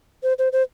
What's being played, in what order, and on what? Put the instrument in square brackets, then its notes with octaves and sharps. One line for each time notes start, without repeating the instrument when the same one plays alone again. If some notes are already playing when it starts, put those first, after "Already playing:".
[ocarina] C5
C5
C5